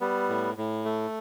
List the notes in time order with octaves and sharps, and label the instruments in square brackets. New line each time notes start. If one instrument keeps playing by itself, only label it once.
[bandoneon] G3 B3
A2
A2
A3